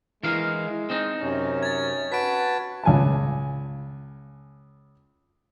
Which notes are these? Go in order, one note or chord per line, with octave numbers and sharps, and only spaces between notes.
E3 G#3 A#4 F5
C4 D#4
F#2 C3 C#4
G#6 A6
F#4 B4 A5 B6 D7
C#2 G#5 A5